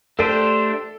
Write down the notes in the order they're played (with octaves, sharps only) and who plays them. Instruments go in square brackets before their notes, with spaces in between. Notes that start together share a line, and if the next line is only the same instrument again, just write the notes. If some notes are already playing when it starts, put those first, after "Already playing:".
[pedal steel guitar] A3 D4 G4 C5 [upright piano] A4